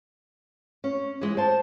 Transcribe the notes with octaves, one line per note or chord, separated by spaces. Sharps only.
C#4
E3 G#3
C5 A5